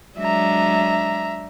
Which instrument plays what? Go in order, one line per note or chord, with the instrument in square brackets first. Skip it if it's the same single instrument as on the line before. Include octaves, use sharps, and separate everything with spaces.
[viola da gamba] F#3 G#3 D4 [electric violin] E5 A#5